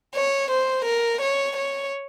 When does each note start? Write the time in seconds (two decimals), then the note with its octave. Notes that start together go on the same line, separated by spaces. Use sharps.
0.15 C#5
0.51 C5
0.85 A#4
1.21 C#5
1.57 C#5